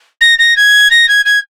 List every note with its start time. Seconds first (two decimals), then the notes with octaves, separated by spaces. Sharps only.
0.21 A#6
0.39 A#6
0.56 G#6
0.91 A#6
1.08 G#6
1.25 G#6